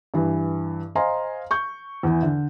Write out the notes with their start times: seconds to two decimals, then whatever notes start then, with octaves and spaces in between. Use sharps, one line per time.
0.14 G2 E3
0.95 C5 D#5 F5 G#5 A#5 C6
1.51 C#6 G6
2.03 E2 E3
2.23 D3